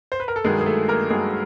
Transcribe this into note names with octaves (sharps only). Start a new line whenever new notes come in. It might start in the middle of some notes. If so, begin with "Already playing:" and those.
C5
B4
A#4
A4
G2 D#3 F#3 G#3 G#4
G#4
A3 A4
A#3 A#4
G2 D#3 F#3 G#3 G#4